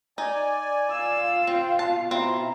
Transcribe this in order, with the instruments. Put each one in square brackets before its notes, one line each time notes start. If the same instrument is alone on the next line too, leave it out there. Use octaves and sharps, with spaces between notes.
[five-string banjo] D#4 [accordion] D5 G#5
[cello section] F4 F5 [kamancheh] E6
[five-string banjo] C4 [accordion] G5
[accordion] B2 [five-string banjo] A5
[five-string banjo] C4 [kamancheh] E4 A#5